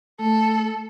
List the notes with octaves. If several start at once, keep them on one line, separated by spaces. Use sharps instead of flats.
A3 A4